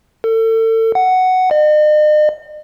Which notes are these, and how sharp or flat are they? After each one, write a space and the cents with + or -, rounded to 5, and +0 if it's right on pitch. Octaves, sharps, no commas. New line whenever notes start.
A4 +35
F#5 +5
D#5 -45